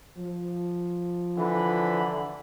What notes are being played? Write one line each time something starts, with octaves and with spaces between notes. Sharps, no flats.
F3
D3 E3 B5